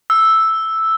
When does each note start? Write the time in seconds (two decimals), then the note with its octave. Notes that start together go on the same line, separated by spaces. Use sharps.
0.10 E6